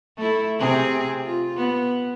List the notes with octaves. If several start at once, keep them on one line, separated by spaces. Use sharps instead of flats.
A3 E4
C3 C4 G#4
F4
B3